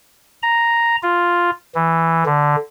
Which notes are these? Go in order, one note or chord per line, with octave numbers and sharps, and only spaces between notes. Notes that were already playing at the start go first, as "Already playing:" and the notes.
A#5
F4
E3
D3